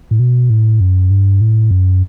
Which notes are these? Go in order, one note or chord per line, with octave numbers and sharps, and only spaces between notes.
A2
B2
A2
F#2
G2
A2
F#2